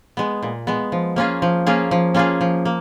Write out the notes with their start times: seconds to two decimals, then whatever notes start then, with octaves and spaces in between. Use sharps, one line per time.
0.17 G#3 B3
0.42 A#2
0.67 G#3 B3
0.92 F3
1.16 A#3 C#4 F4 G#4
1.42 F3
1.67 A#3 C#4 F4 G#4
1.91 F3
2.14 A#3 C#4 F4 G#4
2.41 F3
2.65 A#3